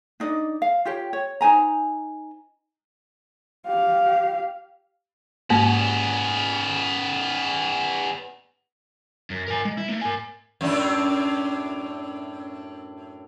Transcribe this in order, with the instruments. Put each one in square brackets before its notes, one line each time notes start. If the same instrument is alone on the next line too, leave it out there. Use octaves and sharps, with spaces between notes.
[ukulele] D4 D#4 D5 D#5
F5
F4 G4 C#5 G5
C#5
D#4 C5 G#5 A#5
[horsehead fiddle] G4 F5
[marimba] G#2 G#3 A#3 [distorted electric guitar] B3 C#4
[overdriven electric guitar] F#2
A#4 G#5
G#3
E4
A3 A#3
A#4 G#5
[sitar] F#2 A2 D4